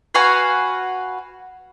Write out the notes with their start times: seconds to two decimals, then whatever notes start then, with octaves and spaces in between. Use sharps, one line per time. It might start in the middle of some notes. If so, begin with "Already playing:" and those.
0.14 F#4 B4 F5 G#5